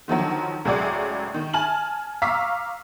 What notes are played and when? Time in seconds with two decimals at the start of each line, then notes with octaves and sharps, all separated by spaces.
0.08 D3 D#3 F3 F#3
0.65 C#2 A2 F#3 G#4 D5 G#6
1.34 D#3
1.54 G#5 A5 F6 F#7
2.22 F5 A#5 C#6 D6 E6 B6